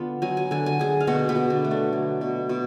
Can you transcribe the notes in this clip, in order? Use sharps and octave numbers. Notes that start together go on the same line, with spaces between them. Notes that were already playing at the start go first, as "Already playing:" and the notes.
Already playing: D3 B3 D4 F4
F#3 G#5
G#5
D3 G#5
G#5
D3 G#4 G#5
F5
B2 F#4 F#5
B3 B4
B2
D3 D4
A3
D3 D4
F#3
B2
B2